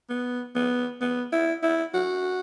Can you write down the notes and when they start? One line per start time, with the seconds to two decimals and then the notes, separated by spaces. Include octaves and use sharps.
0.10 B3
0.55 B3
1.01 B3
1.33 E4
1.63 E4
1.94 F#4